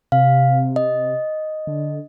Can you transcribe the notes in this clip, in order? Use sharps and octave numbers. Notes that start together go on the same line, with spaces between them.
C3 F5
D#5
D3